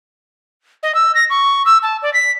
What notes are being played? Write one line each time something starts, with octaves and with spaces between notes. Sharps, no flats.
D#5
E6
A#6
C#6
E6
A5
D5
B6